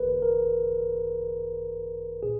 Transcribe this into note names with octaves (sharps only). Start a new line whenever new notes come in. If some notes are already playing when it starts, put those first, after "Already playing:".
Already playing: G#1 F#2 D#3 A#3 G#4 A#4 B4
A#4
A#2 G#4